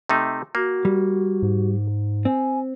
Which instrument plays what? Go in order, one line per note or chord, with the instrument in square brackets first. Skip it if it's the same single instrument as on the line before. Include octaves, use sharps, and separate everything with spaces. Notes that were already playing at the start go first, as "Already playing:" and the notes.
[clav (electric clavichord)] C3 A3 D#4
[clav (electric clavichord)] A#3 [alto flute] F#4
[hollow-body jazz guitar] G3
[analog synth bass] G#2
[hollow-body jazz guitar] C4 [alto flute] G#5